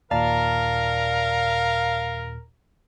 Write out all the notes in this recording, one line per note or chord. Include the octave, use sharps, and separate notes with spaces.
D#2 A#2 A#4 D5 F5 A5 A#5